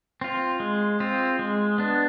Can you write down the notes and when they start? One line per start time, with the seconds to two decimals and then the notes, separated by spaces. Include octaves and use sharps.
0.21 C4 F4
0.60 G#3
1.00 C4 F4
1.39 G#3
1.78 B3 D4